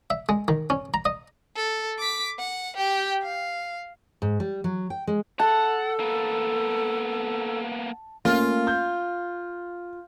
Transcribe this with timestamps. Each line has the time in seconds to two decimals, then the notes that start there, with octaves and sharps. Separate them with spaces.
0.10 E5
0.29 G#3
0.48 D#3
0.70 C#4
0.94 A#5
1.05 D#5
1.55 A4
1.99 D6 B6
2.39 F#5
2.77 G4 G5
3.22 F5
4.22 G#2
4.40 G3
4.64 F#3
4.90 G5
5.07 G#3
5.40 A4 F#5 A5
6.00 A#3 B3
8.25 A3 A#3 C#4 F4
8.67 G6